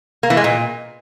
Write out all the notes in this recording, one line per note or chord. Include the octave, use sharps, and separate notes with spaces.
A#3
E3
G#3
A#2